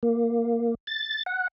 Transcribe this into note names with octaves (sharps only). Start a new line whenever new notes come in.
A#3
A6
F#5